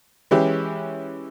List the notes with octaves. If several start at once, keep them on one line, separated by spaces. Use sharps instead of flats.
E3 G#3 C#4 E4 G4